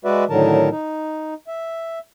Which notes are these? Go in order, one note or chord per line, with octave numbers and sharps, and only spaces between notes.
G#3 F#4 B4 D5 E5
A2 D3 D#3 F#3 A#4 A5
D#4
E5